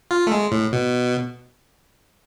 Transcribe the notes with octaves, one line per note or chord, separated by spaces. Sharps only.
F4
A3
G#3
A2
B2